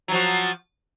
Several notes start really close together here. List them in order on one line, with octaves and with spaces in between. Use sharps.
F#3 F3 F#4